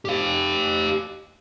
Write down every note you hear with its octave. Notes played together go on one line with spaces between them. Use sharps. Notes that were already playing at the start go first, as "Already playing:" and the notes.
G4 F5